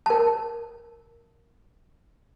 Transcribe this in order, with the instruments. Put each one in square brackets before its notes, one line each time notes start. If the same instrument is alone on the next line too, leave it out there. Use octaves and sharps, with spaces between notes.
[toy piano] A#4 A5